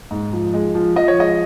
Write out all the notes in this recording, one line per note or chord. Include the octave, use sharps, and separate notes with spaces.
G#2
F3
G#3
F3
F3 D#5
C#5
G#3 D#5